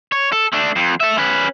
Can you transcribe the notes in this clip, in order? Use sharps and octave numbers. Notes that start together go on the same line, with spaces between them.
C#5
A4
A3 D4
F2
A4 E5
C#4 B4